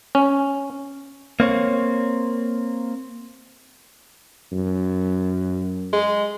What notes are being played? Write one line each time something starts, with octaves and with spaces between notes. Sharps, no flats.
C#4
A#3 C4 C#5
F#2
G#3